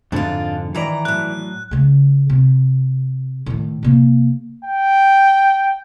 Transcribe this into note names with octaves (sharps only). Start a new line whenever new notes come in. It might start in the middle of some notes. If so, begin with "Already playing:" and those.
F2 G#2 D3 D4 F4
D#3 E3 E4 D5 A#5
A2 F#3 F#6
C#3 G#3
C3
A2 D#3
C3 A#3
G5